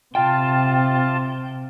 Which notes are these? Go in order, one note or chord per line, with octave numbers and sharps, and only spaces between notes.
C3 F4 G5 A5